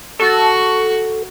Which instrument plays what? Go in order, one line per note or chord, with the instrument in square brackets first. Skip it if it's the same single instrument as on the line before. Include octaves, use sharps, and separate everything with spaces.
[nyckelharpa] F#4 C#6 [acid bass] A4